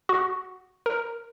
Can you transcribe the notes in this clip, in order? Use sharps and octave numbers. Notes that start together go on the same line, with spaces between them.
F#4
A#4